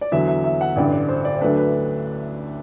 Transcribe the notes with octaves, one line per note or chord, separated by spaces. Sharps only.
D5
E2 D3 F#3 E5
E5
E5
F#5
A1 G2 D3 D5
D5
C5
D5
C5
D2 D3 F#3 A3 D4 B4
B4